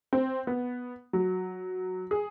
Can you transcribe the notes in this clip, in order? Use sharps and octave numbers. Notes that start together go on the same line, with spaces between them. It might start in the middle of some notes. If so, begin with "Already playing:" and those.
C4
B3
F#3
G#4